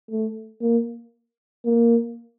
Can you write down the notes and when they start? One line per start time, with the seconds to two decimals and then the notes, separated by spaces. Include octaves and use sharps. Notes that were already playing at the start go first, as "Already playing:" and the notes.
0.11 A3
0.62 A#3
1.65 A#3